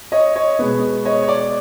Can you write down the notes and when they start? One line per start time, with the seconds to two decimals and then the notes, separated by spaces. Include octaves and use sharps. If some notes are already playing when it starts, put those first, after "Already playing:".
0.12 C#5 D#5
0.35 C#5 D#5
0.59 B2 G#3 B3
1.05 C#5 D#5
1.22 C#5
1.28 D5